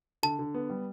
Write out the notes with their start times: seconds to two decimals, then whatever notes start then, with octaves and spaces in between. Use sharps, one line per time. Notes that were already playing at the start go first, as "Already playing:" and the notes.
0.23 D3 A5
0.39 D3
0.54 B3
0.70 G3